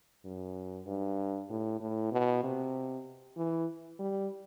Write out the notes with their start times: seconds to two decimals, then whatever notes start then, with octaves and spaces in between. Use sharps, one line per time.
0.25 F#2
0.87 G2
1.50 A2
1.80 A2
2.12 B2
2.44 C3
3.37 E3
3.99 G3